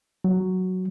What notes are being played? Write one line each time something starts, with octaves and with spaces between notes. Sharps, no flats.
F#3